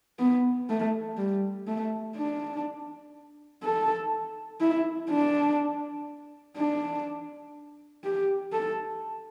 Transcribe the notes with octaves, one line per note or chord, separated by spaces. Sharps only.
B3
A3
G3
A3
D4
A4
E4
D4
D4
G4
A4